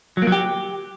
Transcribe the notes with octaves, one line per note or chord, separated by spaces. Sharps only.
F#3
A#3
F#3
G4